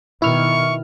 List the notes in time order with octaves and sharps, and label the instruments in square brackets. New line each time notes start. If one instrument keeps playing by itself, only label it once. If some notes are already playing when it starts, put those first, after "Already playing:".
[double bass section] B2 D#3 [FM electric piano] E4 F6 [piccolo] C#6